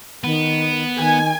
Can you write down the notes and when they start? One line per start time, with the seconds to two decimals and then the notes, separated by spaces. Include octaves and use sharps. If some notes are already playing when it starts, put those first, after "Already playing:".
0.24 D#3 B3
0.98 D#3 G#5